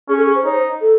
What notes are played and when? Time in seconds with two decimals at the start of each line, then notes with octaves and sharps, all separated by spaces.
0.08 C#4 G#4
0.17 A4
0.26 G#4
0.35 C5
0.44 D#4 C#5
0.53 C5
0.81 A4